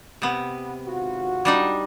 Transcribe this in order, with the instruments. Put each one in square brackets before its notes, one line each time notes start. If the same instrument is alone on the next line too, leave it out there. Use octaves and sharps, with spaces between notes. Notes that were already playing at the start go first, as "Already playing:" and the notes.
[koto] C3 B3
[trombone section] G#1 F4 F#4
[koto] G3 D4 D#4